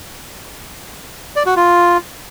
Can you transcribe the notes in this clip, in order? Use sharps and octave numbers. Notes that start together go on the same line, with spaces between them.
D5
F#4
F4